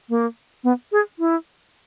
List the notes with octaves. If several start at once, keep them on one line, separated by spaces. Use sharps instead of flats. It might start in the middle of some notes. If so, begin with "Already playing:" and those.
A#3
B3
G#4
E4